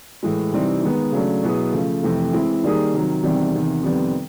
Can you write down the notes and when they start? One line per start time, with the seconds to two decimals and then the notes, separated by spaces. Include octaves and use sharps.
0.23 A2 E3 G#3
0.53 C3 E3 G3 C4 D#4
0.83 D#3 G#3 B3 D#4
1.12 C#3 F#3 A3 D4
1.43 B2 F#3 B3 E4 G#4
1.73 C#3 F3 A3
2.03 F2 C3 E3 A3
2.33 E3 G#3 C4 E4
2.63 D#3 G3 A#3 D#4 G#4
2.93 C3 D#3 F#3
3.23 E2 C3 D#3 G3 C4
3.53 E2 C3 D#3
3.83 F2 C3 D#3 G3 B3